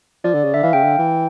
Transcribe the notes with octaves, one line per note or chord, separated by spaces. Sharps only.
F3 D5
D3
C#3
D3 E5
E3 F5
C#3 G5
D3
E3